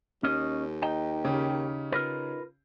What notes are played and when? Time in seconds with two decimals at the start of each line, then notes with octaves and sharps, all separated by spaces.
0.23 D#2 C#4 D#5
0.82 D#4 G5
1.25 C#3 C#4 G4
1.92 F4 A#4 B4